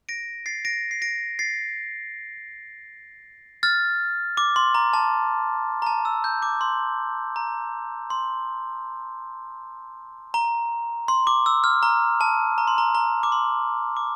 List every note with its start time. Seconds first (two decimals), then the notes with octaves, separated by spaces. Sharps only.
0.09 A#6 D7
0.46 A6 C7
0.65 A#6 D7
0.91 C7
1.02 A#6 D7
1.39 A6 C7
3.63 F6 A6
4.37 D6
4.56 C6
4.75 A#5
4.94 A5
5.82 A#5
5.86 A5
6.05 E6
6.24 G6
6.42 D6
6.61 C6
7.36 A#5
8.10 C6
10.34 A#5
11.08 C6
11.27 D6
11.46 E6
11.64 F6
11.83 A#5
12.21 A5
12.58 A#5
12.68 C6
12.78 A#5
12.95 A#5
13.23 D6
13.32 C6
13.97 D6